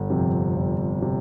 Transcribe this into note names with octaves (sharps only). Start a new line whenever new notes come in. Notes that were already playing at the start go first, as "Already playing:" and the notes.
Already playing: G1
F2 C3
G1
C3